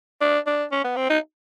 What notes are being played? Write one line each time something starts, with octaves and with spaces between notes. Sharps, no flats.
D4
D4
C#4
B3
C4
D#4